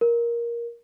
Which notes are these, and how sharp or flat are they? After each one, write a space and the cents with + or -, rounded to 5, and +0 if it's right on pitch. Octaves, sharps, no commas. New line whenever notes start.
A#4 +10